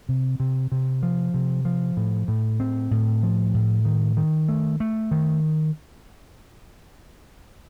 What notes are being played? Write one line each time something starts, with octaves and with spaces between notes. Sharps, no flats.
C3
C3
C3
F3
C3
F3
A2
A2
C4
A2
F3
A2
D#3
D#3
A3
A3
D#3